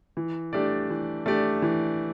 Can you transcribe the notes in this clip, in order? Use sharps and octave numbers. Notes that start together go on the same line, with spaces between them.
E3
A3 D4 G4 D5
E3
A3 D4 G4 D5
E3